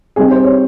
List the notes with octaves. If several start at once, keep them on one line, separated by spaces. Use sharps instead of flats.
C3 G3 C4 D#4 G#4
C5
C#5